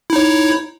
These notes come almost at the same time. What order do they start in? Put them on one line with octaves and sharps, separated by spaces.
E4 D#4 C#5